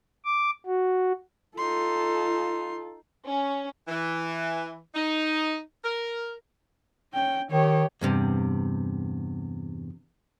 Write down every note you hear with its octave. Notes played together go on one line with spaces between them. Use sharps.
D6
F#4
D#4 F4 A4 C6
C#4
E3
D#4
A#4
C#4 G5
D#3 G4 C#5
E2 G2 C3